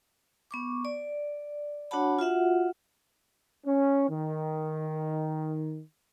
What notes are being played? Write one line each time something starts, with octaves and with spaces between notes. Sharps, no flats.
B3 C#6 D6
D5
D4 F#4 C#5 F#5 A5 B5
F4 F#4 E5 F#5
C#4
D#3